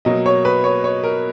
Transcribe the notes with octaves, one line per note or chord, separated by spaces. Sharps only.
B2 F#3 A#3 D#5
C#5
B4
C#5
C#5
A#4